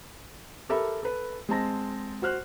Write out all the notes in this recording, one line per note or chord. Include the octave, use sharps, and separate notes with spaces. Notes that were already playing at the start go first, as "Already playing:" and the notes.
G4 A4 A#4 E5 B5
A4 B4
G#3 C4 A5 A#6
F#4 C5 F6 F#6